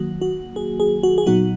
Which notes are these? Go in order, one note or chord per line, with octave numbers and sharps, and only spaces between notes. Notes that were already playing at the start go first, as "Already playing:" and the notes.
Already playing: D#3 F#3 A#3 F#4
F#4
G#4
G#4
F#4
G#4
A#2 F#3 B3 D#4 F#4